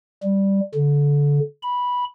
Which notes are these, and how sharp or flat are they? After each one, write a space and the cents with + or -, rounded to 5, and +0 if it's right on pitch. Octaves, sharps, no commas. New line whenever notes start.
G3 +0
D3 -25
B5 -10